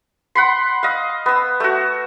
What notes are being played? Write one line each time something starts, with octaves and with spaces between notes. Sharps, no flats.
F#5 B5 C6
D#5 F5
B3 E6
A3 F#4